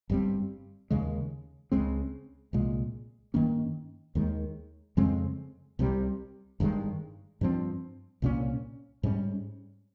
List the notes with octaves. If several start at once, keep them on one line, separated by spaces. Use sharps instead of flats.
G1 G2 G3 C4
D#2 C#3 G#3
C#2 C#3 G#3 C4
C2 A#2 G#3
G2 D#3 A#3 C#4
D#2 D#3 G#3
F2 C#3 G#3 C4
C2 C3 G3
G1 G2 D#3 G#3
G2 F3 C4
C2 A#2 G#3 C#4
G#2 G3 C#4